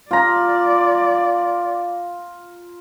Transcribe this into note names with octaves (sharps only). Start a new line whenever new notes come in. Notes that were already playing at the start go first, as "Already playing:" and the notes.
F4 D5 A#5